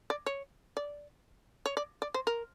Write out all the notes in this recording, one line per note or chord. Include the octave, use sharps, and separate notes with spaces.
D5
C#5
D5
C#5
D5
D5
C5
A#4